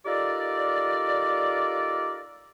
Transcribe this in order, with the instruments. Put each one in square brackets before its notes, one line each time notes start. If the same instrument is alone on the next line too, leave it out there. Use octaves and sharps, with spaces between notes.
[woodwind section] D#4 F4 G4 A4 A#4 D5